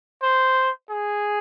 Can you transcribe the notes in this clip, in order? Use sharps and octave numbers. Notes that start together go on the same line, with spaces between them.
C5
G#4